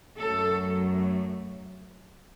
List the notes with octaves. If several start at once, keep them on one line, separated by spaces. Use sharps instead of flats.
F#2 F#3 A3 A4